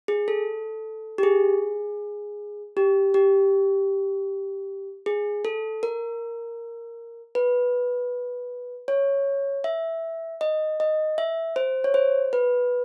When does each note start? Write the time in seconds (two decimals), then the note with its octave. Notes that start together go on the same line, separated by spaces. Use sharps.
0.08 G#4
0.28 A4
1.18 G4
1.23 G#4
2.77 G4
3.14 G4
5.06 G#4
5.45 A4
5.83 A#4
7.35 B4
8.88 C#5
9.64 E5
10.41 D#5
10.80 D#5
11.18 E5
11.56 C5
11.84 C#5
11.94 C5
12.33 B4